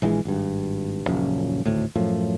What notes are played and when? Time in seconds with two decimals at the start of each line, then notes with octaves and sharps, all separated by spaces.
0.02 A#1 E3 F#3 G#3
0.25 G#1 G2
1.06 D#1 A#1 F#2 C#3
1.65 G#1 D2 A2
1.95 F#2 A2 F3